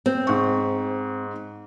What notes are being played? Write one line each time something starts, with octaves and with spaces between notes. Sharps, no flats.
C4
G#2 C#6